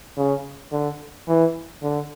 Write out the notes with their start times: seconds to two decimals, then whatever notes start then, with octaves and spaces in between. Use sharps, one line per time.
0.17 C#3
0.72 D3
1.28 E3
1.83 D3